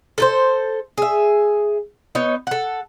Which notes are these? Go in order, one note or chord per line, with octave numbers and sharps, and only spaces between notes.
A4 B4 C5
G#4 E5
B3 D#4 C#5
A4 F#5